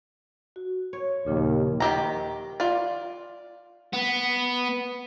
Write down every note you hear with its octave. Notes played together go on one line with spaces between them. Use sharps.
F#4
C#5
D#2 A#2 C#3 F3
D#3 G4 A#5
F4 D5
B3